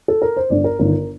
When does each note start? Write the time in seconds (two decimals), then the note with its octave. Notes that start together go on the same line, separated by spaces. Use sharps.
0.08 A4
0.22 A#4
0.36 C5
0.50 G1 G2 D3 D5
0.64 A#4
0.79 G1 G2 D#3 A#4